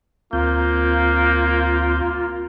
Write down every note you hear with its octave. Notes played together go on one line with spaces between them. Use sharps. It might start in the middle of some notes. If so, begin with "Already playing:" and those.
D2 A#3 C4 F4 G6